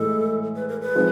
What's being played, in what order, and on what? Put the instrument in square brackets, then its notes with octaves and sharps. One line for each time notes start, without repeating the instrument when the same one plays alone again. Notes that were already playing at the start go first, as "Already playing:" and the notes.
Already playing: [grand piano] A2 E3 G#3 [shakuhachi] A4
[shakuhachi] B4
A#4
B4
[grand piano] F3 G#3 C4 D#4